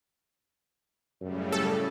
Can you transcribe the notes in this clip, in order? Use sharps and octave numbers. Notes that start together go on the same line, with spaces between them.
F#2 A2 C#3 G3
A4